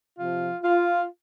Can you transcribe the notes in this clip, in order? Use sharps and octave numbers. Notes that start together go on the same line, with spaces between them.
C3 F3 F4
F4